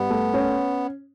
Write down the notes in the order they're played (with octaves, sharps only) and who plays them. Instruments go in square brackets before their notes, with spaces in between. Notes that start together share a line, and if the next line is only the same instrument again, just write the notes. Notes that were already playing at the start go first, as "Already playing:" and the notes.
Already playing: [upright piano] G2 [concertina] B3
[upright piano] A3
C#4